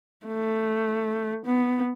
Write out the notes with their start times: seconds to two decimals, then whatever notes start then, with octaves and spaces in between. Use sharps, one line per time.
0.26 A3
1.46 B3